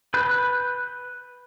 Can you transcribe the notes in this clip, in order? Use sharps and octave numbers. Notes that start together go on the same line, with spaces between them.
B4 B5 F#6 G6